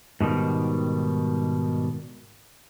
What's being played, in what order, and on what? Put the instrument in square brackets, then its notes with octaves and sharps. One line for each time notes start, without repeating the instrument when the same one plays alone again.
[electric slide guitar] G#2 B2 D#3 G3